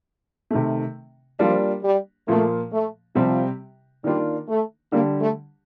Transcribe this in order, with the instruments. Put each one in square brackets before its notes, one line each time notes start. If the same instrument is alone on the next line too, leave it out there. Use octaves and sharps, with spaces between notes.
[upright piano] C3 D#3 A3
[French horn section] F3 [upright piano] G3 A#3 D4 F4
[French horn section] G3
[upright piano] A#2 F3 A#3 [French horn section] A3
[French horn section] A3
[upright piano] C3 G3 C4 G4 [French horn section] F3
[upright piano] D#3 A#3 D4 F4 [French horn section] G3
[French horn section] A3
[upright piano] D3 G3 D4 G4 [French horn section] A#3
[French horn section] A3